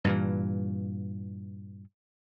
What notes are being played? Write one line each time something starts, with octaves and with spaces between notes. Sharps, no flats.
G2 A#2 E3